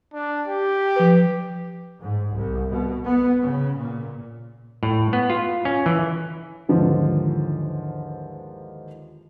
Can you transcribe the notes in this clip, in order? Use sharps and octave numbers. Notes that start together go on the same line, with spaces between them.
D4
G4
F3 B4
G#2
C2
B2
B3
C#3
A#2
A2
B3
F4
C#4
E3
D#2 G#2 D3 E3 F3